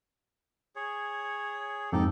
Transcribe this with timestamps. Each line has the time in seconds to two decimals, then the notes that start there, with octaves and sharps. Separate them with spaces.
0.76 G#4 C#5
1.92 F2 G#2 D#4 G4 A4